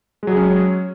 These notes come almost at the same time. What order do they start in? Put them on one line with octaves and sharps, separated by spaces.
G#3 F#3 G#4 C#4